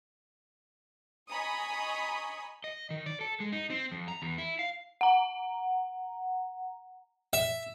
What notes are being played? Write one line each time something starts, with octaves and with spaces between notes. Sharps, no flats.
D#5 G#5 A#5 B5 C#6 D#6
D#5
D#3
D5
A4
G#3
D#4
C4
F2
A#5
E2
E4
F5
F#5 A#5
E5